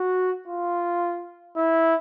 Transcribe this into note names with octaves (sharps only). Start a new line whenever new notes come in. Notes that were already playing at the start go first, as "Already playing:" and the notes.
Already playing: F#4
F4
E4